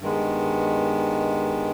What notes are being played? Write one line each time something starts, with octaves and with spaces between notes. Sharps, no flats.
G2 D#3 G#3 B3